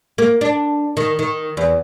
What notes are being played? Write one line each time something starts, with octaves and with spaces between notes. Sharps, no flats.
A#3
D4
D#3
D#3
E2